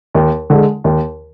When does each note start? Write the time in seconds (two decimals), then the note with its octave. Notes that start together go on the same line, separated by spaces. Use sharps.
0.14 D#2
0.50 D3 G#3
0.84 D#2